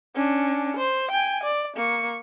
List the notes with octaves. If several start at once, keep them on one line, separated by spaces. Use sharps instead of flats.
C#4 D4
C5
G5 G#5
D5
A#3 C#6